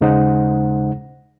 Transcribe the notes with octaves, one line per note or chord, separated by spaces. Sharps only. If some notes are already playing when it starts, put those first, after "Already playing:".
D#2 C#3 G#3 D#4 C5 F#5